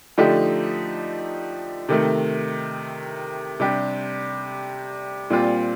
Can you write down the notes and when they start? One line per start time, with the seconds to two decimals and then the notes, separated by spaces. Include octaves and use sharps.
0.18 D3 F3 A3 D#4 G4
1.89 C3 D#3 A3
3.60 C3 G3 D4 G4
5.30 A#2 G3 C4 F4